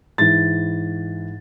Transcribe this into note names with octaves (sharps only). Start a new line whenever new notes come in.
G#2 E3 A6